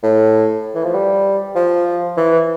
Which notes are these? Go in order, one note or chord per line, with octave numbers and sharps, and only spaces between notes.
A2
E3
F3
G3
F3
E3